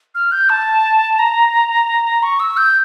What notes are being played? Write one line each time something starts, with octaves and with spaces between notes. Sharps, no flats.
F6
G6
A5
A#5
C#6
E6
G6